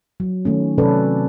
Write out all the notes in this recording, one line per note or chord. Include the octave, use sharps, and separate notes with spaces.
F#3
D#3 A3 C#4
C3 F#3 C#4 A4 B4 D5